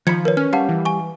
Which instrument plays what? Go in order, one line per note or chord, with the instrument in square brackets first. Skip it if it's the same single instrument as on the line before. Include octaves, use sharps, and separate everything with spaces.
[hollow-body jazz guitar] D#3 B5 [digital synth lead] F3 [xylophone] G#6 C#7
[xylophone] A#4 B4 C#5
[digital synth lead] C#4 [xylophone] F6
[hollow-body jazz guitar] G3 [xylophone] F5 F#5 A5
[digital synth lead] E3
[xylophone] G#5 C#6